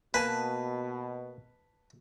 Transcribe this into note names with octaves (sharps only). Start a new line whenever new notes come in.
B2 A#3 B4 G#5 A5